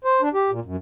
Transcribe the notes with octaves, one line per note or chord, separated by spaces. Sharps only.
C5
D4
G4
A#2
F#2